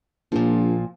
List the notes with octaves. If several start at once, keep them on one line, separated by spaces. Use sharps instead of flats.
A#1 A#2 F3